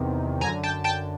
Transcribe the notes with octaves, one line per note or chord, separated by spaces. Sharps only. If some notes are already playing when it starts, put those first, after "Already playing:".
Already playing: E2 C3 D#3
F#2 D3 G#5 A#5
G5 A5
G5 A5